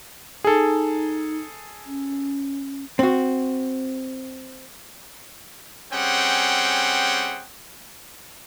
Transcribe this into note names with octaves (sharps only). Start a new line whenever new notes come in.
D#4 G#4 A4
C#4
C4 F#4
G3 C4 C#4 G#4 F#5 G5